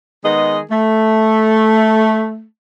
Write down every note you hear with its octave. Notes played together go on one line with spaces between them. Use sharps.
D#3 G#3 B3 G#4 D#5
A3